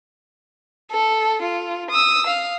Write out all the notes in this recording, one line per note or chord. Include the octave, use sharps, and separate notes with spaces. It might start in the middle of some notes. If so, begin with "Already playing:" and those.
A4
F4
D#6 E6
F5